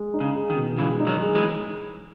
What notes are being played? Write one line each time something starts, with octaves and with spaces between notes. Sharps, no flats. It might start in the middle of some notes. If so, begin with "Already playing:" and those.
Already playing: G#3
D#4
C#3
G#4
D#3
B2
C#3 E3 G#3
D#4
D#3 F#3
G#4
E3 G#3